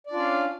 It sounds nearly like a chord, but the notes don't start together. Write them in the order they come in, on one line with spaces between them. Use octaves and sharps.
D5 D4 F4 C#4 F5